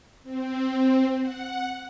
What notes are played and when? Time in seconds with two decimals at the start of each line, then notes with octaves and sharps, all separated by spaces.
0.24 C4
1.20 F#5